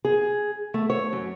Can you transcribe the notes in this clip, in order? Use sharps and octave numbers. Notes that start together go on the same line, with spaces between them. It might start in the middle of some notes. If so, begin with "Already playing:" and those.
G#4
A3
C#5
F#2